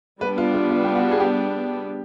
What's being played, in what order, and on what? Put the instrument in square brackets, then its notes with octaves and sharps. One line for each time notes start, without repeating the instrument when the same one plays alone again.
[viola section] G3 B3 D4 [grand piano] B4
[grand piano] F4
F4
F4
G4
F#4
G#4
G4